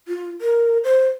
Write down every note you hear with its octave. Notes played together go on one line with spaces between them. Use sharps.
F4
A#4
C5